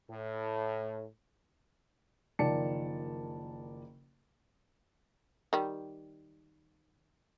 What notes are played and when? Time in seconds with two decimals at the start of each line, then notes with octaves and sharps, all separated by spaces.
0.10 A2
2.39 F#1 D#3 F3 D5 A5 C#7
5.53 D#3 G3